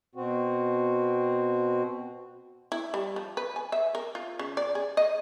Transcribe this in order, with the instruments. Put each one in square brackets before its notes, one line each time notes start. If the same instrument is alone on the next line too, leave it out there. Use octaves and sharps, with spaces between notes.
[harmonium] B2 C4 F#4
[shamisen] E4
G3
F3
B4
G#5
E5
A#4
F4
C#3
D5
G#4
D#5